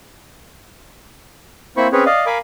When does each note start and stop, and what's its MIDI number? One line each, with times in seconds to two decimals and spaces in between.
1.77 1.87 58
1.77 1.87 60
1.77 1.87 64
1.77 1.87 72
1.77 1.87 83
1.77 1.87 85
1.92 2.04 60
1.92 2.04 61
1.92 2.04 68
1.92 2.04 71
1.92 2.04 73
2.06 2.26 74
2.06 2.26 75
2.06 2.26 77
2.26 2.38 70
2.26 2.38 77
2.26 2.38 80
2.26 2.38 83
2.26 2.38 86